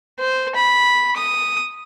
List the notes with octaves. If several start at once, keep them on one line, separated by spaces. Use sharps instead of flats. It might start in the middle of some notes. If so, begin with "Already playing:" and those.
C5
B5
D#6